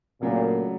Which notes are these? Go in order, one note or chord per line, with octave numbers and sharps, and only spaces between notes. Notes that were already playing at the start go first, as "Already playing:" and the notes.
A#2 C#3 F#3 A3 D4